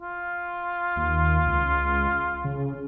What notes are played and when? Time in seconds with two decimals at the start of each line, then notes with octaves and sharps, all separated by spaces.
0.01 F4
0.96 D#2
1.46 C#2
2.45 C#3